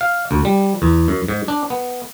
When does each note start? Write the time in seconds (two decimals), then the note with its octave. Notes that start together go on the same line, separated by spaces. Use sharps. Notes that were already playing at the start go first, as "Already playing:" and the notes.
0.01 F5
0.31 D2
0.45 G3
0.82 E2
1.08 F#2
1.28 G#2
1.48 D4
1.70 B3